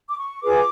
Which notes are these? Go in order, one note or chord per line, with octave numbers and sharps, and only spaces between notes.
D6
C#6
F4 G#4 B4 D6